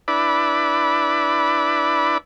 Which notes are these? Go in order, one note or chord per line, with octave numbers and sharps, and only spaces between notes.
D4 E4 B4 D5 B5